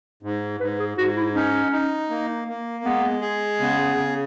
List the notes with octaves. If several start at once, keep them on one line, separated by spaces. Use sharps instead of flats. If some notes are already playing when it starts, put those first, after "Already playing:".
G#2
G#2 B4
G#4
G#2 F#4
E4
C#4 D#4
D#4
A#3
A#3
G#3 B3
G#4
C#3 B3
C#3